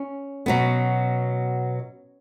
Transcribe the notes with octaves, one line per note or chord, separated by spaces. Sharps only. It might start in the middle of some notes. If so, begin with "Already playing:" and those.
Already playing: C#4
B2 F#3 B3